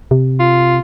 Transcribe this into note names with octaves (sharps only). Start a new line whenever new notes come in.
C3
F4